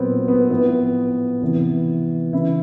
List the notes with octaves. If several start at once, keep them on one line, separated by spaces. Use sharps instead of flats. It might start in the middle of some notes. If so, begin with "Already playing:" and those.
Already playing: A#2 F#3 B3 C4
B3
A2 F3 B3
C3 E3
C#3 E3 E4